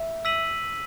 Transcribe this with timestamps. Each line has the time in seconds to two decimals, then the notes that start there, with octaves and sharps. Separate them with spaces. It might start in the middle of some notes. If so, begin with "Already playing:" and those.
Already playing: E5
0.25 E6 B6 D#7 F#7